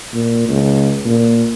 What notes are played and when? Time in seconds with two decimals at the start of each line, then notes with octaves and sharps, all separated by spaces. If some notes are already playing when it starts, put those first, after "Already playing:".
0.13 A#2
0.49 C#2
1.05 A#2